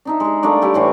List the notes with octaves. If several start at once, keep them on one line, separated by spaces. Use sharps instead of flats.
D4 D#4 E5
G#3 G#4
A3 A#3 D4 D5
G3 E4 G4
A2 E3 C5 C#6